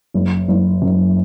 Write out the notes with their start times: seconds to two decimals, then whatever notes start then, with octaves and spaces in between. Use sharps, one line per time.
0.14 F#1
0.48 F#1
0.82 F#2